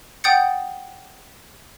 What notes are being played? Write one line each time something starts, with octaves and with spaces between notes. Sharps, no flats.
F#5 G5 D#6 G6 A6 C#7